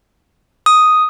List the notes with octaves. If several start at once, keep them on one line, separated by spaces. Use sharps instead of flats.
D#6